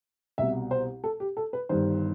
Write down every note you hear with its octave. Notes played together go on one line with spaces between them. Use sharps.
C2 B2 E5
C5
A4
G4
A4
B4
G1 G2 D#3 C5